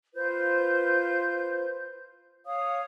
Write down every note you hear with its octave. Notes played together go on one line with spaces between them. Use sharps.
F4 B4 C5 G6
C#5 F5 D#6